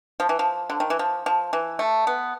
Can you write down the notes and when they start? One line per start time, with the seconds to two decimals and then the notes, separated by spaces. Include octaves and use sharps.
0.20 F3
0.29 E3
0.39 F3
0.70 D3
0.80 D#3
0.90 E3
0.99 F3
1.26 F3
1.53 E3
1.79 A3
2.07 B3